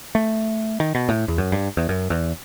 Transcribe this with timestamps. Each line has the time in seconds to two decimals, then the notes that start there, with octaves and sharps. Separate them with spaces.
0.15 A3
0.80 D#3
0.95 B2
1.09 A2
1.28 E2
1.38 F#2
1.52 G2
1.77 E2
1.89 F#2
2.10 E2